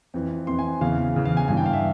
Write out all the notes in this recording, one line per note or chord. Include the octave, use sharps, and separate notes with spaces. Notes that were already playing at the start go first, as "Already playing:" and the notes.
F2 E3
F2 E3 C6
G#5
E2 C#3 E3 F5
E2 C#3 E3
F5
G#5
G2 E3 G#5
G5
F5
E5